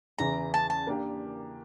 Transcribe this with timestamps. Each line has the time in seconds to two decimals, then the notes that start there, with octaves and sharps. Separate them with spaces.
0.18 E2 C#3 E3 A#5
0.54 A5
0.70 A5
0.87 A#3 D4 G4